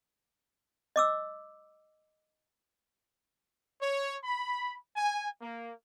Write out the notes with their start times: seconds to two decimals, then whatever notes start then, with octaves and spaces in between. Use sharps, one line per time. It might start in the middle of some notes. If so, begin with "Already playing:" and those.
0.96 D#5 D6 E6
3.82 C#5
4.24 B5
4.96 G#5
5.41 A#3